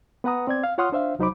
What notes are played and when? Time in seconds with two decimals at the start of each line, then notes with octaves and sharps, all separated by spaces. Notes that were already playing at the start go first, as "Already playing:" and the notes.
0.24 B3 B4 F#5 A#5 D#6
0.47 C4 D5 G#6
0.64 F5
0.78 F4 C#5 F#5 C6 D#6 F6
0.92 D4 C5 E5 F5
1.19 C2 F#3 D#4 C5 B5 D6